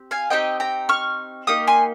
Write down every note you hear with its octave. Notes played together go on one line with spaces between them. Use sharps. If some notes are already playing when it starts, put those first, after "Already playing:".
Already playing: C4 G4
F5 G#5
C4 D#4 G4 D#5 G5
G5 A#5
C#6 F6
A#3 D#4 G4 D#6
G#5 C6